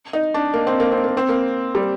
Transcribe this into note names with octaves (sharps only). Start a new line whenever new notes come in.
D#4
D4
A#3
C4
A#3
C4
A#3
C4
A#3
G3